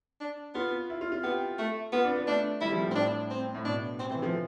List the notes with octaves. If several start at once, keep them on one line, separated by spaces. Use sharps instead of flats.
D4
B3 F4
E4
F4
F4
B3 G4
A3
B3 F4
D4
B3
A3 D4
G3 E4
F3
A2
C4
D4
C4
A2
B2 D4
C3 C4
E3 C4
F3 C4